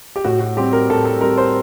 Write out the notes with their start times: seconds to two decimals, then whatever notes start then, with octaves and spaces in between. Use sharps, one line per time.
0.16 G4
0.24 A2 F#4
0.41 F#4
0.57 G3 C4 G4
0.73 A#4
0.90 A2 A4
1.05 A4
1.21 G3 C4 A#4
1.38 C5